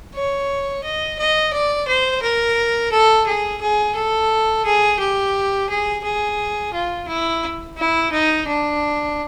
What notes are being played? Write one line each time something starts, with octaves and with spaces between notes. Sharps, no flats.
C#5
D#5
D#5
D5
C5
A#4
A4
G#4
G#4
A4
G#4
G4
G#4
G#4
F4
E4
E4
D#4
D4